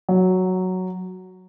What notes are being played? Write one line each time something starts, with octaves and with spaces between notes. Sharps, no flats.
F#3